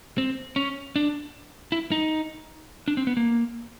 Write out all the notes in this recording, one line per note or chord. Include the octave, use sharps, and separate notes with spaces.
C4
C#4
D4
E4
D#4
D4
C4
B3
A#3